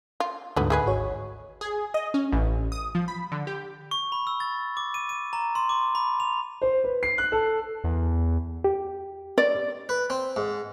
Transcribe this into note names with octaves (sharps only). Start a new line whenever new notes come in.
F4
D2 G#2 D3 F#3 B3
G#3 G#4 B4
G#1 F#4 C#5
G#4
D#5
C#4
A1
D#6
F3
B5
D3
G4
C#6
B5
E6
A6
D6
D#7
D#7
A#5
C6
D6
B5
F7
C5
B4
C7
F#6
A4
E2
G4
D5
B4
C4
G#2